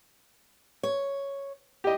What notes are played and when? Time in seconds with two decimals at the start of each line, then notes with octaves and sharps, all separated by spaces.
0.83 C#5
1.84 G4 D#5